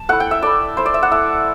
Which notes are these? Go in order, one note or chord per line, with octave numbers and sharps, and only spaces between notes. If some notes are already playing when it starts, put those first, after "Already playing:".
Already playing: A5
A3 E4 F#5
G5
E5
A3 E4 D5
A3 E4 C5
D5
E5
F#5
A3 E4 E5